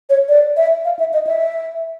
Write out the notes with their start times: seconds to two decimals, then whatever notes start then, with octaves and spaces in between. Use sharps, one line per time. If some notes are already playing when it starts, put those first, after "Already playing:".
0.10 C#5
0.29 D5
0.57 E5
0.85 F5
0.99 E5
1.13 D#5
1.27 E5